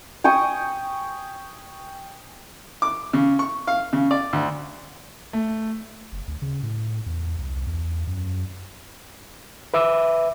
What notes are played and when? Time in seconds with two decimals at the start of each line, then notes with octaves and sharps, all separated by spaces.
0.24 G5 G#5 C#6 D#6
2.82 D6
3.13 C#3
3.39 C#6
3.67 F5
3.93 C#3
4.11 D5
4.33 D2
5.33 A3
6.12 F#1
6.27 D2
6.42 C#3
6.63 A2
7.06 E2
7.38 C2
7.66 E2
8.07 F#2
9.74 B4 E5 D6 E6